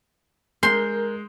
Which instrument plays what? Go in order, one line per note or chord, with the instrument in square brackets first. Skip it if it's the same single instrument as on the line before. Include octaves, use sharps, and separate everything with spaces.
[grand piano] G#3 G6 [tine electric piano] A#4 [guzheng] C6